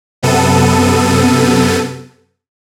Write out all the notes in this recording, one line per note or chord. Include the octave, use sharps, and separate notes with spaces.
F#2 C3 B3 A4 D#7